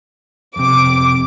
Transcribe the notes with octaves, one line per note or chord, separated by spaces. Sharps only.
F2 C3 D6